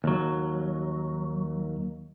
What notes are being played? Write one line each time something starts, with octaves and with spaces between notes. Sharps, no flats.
D#2 F#3